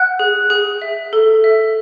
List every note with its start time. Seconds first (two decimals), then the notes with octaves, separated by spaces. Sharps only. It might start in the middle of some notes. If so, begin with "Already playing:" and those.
Already playing: F#5 F#6
0.19 G#4
0.50 G#4
0.82 E5
1.13 A4
1.44 E5